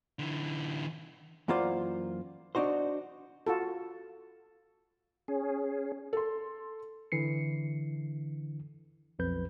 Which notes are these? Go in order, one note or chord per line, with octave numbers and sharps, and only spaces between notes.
D3 E3
F#2 E3 A#3 F4 C5 D5
D4 D#4 F#4 C5
F4 F#4 A4
C#4 G#4
A4 C6
D3 E3 C7 C#7
B1 F2 B4 G6